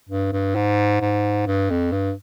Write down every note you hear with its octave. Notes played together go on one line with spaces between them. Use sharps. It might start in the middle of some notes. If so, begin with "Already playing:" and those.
G2
G2
G#2
G#2
G2
F2
G2